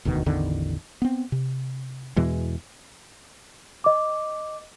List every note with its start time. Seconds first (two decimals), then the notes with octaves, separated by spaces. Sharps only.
0.05 E1 D2 B2 D#3
0.26 A1 E2 D3 D#3
1.02 B3 C4
1.32 C3
2.16 E2 B2 E3 G#3
3.84 D#5 D6